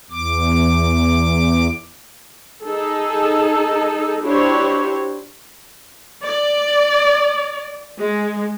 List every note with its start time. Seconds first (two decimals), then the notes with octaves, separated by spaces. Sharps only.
0.11 E2 D6
2.63 D#4 G#4 A4
4.23 D4 E4 F#4 G4 C5 C#5
6.24 D5
7.98 G#3